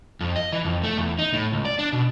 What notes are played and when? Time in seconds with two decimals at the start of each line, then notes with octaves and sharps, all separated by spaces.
0.21 F2
0.36 D#5
0.52 E3
0.65 F2
0.83 A3
0.97 E2
1.19 D#4
1.33 A2
1.52 C#2
1.65 D5
1.79 D4
1.93 B2